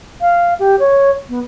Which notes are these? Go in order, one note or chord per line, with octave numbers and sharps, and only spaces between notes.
F5
G4
C#5
B3